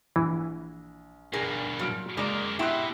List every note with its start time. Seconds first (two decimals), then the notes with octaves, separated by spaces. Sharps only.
0.16 A#1 E3
1.33 G2 B2 G#4 A#4
1.79 A#2 F#3 F6 D7
2.17 C#3 G#3 A#3 A#4 D5
2.59 B2 E4 G4 G5 C6 F#6